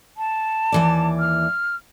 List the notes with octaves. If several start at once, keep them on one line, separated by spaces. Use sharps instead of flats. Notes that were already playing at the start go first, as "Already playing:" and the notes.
A5
D#2 E3 D5
F6